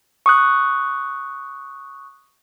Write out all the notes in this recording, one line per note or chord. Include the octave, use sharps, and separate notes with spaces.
C#6 D#6 F#6